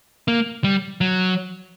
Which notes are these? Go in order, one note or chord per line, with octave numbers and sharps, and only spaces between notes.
A#3
G3
F#3